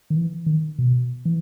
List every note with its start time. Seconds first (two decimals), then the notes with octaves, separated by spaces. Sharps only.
0.10 D#3
0.16 E3
0.46 D#3
0.79 B2
1.25 E3